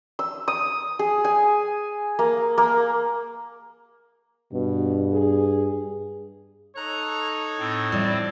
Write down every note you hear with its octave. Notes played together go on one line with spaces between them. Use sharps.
E6
D#6
G#4
G#5
A#3
A#3
G2 B2
G#4
D#4 A4 C#5 A#5 F#6
A2 C4
F3 G3 E4 D5